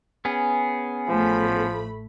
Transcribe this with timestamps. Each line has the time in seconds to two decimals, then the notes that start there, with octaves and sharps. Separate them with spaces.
0.25 B3 C#4 G#4
1.09 A1 F3 A3 B5